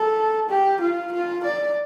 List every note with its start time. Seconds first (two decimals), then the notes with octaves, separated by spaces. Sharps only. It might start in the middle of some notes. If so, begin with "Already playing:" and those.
Already playing: A4
0.49 G4
0.81 F4
1.12 F4
1.44 D5